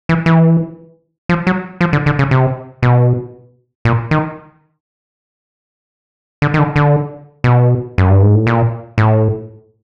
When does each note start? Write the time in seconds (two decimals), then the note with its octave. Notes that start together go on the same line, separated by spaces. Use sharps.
0.09 E3
0.26 E3
1.29 F3
1.47 F#3
1.81 F3
1.93 D3
2.06 D3
2.19 C#3
2.31 C3
2.83 B2
3.85 A#2
4.11 D#3
6.42 D3
6.54 D#3
6.59 D3
6.76 D3
7.44 B2
7.98 F#2
8.10 G2
8.23 G#2
8.35 A2
8.47 A#2
8.98 A2